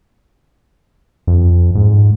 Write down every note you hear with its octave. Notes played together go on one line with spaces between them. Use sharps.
F2
G#2